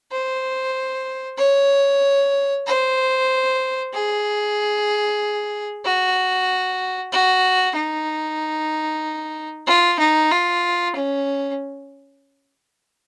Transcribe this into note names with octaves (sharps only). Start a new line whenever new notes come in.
C5
C#5
C5
G#4
F#4
F#4
D#4
F4
D#4
F4
C#4